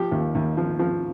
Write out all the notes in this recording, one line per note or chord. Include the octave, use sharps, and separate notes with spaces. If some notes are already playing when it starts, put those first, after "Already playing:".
Already playing: F3 G4
D#2
D#2
F3
F3